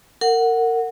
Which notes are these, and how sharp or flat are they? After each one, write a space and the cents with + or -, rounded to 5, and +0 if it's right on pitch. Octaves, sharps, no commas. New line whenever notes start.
A#4 -30 F#5 +0